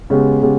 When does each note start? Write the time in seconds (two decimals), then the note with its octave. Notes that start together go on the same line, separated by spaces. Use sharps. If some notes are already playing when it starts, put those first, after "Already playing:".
0.10 C#3 G#3 B3 G4
0.42 C#3 G#3 B3 G4